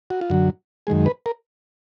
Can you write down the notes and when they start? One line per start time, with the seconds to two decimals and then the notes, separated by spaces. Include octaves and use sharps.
0.10 F#4
0.21 F4
0.30 F#2 D3 F#3 F#4
0.87 F#2 D#3 G#3 G#4
1.06 B4
1.26 A#4